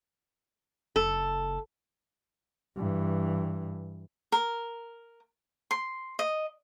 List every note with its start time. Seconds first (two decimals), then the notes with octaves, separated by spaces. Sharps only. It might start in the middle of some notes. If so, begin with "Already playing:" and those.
0.96 F#1 A4
2.76 G2 E3
4.32 A#4
5.71 C6
6.19 D#5